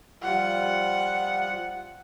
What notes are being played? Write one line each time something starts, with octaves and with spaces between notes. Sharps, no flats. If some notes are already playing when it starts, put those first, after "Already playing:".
F3 G3 F4 F#5